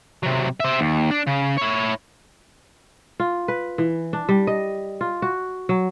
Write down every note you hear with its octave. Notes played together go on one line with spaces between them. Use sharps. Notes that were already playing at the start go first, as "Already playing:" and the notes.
C3 F#3
C5 E5
D#2
D4
C#3
E4 C#5
F4
B4
E3
D4
G3
D#5
F4
F#4
F#3